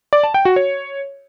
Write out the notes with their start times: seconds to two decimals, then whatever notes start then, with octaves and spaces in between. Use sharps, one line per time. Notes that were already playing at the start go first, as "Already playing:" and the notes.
0.13 D5
0.24 A5
0.34 G5
0.45 F#4
0.56 C#5